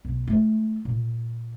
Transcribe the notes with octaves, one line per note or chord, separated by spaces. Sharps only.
B1
A3 F4
A#2